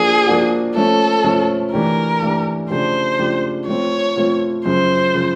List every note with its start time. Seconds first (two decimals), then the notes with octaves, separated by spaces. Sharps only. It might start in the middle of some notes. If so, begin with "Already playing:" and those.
Already playing: F3 A#3 D4 F#4 G#4
0.27 F3 A#3 D4 F#4
0.75 F3 A3 C#4 A4
1.24 F3 A3 C#4
1.73 E3 A3 D4 G4 A#4
2.22 E3 A3 D4 G4
2.70 C#3 F3 A3 D4 G4 C5
3.19 C#3 F3 A3 D4 G4
3.67 F3 A3 C4 F4 C#5
4.16 F3 A3 C4 F4
4.65 F#2 C#3 F3 C5
5.14 C#3 F3